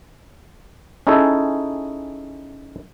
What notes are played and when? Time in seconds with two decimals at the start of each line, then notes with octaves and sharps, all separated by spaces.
1.07 C#4 D#4 E4 G#4 A4